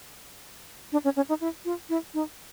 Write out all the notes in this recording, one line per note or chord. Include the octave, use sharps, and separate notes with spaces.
D4
C#4
C#4
D#4
E4
F4
E4
D#4